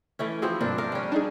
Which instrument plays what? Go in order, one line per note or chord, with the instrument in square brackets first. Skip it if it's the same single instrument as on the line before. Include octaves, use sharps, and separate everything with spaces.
[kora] E3 A3 C#4
[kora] F3 C4 E4 [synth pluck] F#4 G#4
[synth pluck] G2 B2 A#3 [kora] C4 D4
[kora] D4 A#4 F5 [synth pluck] A#5
[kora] G3 C#4
[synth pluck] D4 D#4 G#4